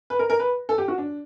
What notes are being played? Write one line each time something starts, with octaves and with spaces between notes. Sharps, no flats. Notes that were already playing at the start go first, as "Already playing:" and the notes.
B4
A#4
A#4
B4
A4
G4
F#4
D4